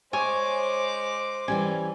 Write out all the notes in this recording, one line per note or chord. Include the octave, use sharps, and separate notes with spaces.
G#3 C5 C#5 G#5 D6
E3 G3 C#4 G#5